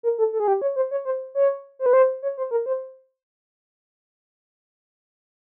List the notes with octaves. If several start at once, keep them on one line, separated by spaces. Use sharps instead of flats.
A#4
A4
A4
G#4
G4
C#5
C5
C#5
C5
C#5
C5
B4
C5
C#5
C5
A#4
C5